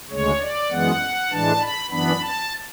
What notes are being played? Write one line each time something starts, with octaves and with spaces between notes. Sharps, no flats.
D2 C#3 G#3 C#5
D5
F#2 E3 G#3 B3 F#5
A2 E3 G#3 D4 A5
B5
F#2 E3 B3 D4 B5
A5